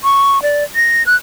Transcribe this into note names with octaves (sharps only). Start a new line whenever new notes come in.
C#6
D5
A#6
F#6